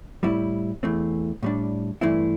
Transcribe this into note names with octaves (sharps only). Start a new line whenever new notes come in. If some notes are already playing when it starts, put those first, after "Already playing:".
A2 G3 C4 E4
E2 E3 A3 C4
A2 G3 D4
G2 E3 A3 C4 E4